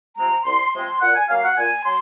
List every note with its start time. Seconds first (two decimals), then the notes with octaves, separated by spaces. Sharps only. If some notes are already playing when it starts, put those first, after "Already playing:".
0.17 C3 F3 G#3 C4 A#5
0.45 C2 C6
0.73 C3 F3 G#3 C4 C6
1.01 A#2 F#5
1.15 G#5
1.29 F#3 A#3 F5
1.44 F#5
1.57 A#2 G#5
1.85 F#3 C6